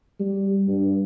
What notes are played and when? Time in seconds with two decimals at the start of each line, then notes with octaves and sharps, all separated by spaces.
0.20 G3
0.68 G2